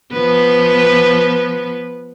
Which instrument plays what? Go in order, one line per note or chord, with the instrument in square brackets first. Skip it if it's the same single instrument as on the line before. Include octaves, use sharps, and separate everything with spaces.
[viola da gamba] F3 B3 B4